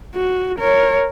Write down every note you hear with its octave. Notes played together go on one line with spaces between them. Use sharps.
F#4
A#4 C#5